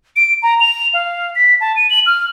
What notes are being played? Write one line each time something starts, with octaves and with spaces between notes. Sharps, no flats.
D7
A#5
F7
F5
B6
A5
D#7
F#7
F6